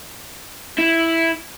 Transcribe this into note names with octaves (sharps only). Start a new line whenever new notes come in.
E4